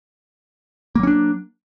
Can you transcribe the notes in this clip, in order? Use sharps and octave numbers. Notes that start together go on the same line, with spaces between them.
F#3 A#3 C#4 D4